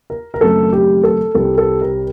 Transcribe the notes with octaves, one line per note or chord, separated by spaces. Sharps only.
A#4
A#4
F#1 F#2 D#3 A3 C4 A4
G4
A4
C2 C3 G3 C4 A4
A4
A#4